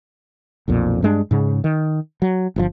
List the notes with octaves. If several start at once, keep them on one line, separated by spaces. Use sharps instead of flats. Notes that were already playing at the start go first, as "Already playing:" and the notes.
B1 F2 A#2
G2 G#3 D4
G#2 C#3
D#3
F#3
G1 B2 F3